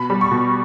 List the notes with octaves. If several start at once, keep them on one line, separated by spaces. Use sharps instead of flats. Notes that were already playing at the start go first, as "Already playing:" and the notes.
Already playing: B2 B5
G3
C#6
B2